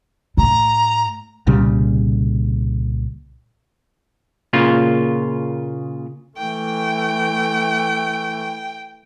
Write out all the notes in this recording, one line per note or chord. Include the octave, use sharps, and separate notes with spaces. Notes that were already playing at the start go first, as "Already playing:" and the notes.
A2 A#5
C2 A#2 C#3 G3
A#2 C#3 F4
E3 A3 G5